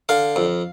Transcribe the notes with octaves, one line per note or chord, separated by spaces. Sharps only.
D3 F5
F2